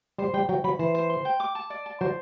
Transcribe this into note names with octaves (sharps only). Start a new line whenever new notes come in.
G3 C5
G3 G5
F#3 G5
F#3 B5
E3 C5
C5
C6
G5
D6
A5
D5
A5
F#3 C5